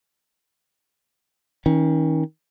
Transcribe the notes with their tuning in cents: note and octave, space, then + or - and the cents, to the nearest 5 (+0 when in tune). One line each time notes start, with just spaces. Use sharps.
D#3 +30 C#4 +0